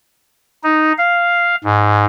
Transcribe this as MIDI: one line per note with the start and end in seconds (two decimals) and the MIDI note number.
0.63 0.92 63
0.98 1.56 77
1.64 2.05 44